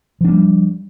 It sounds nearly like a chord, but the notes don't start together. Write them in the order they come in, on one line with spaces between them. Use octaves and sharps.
F3 D4 A#3 G3